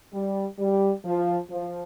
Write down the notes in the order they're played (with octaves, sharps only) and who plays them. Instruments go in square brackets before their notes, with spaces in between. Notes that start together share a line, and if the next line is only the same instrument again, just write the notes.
[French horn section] G3
G3
F3
F3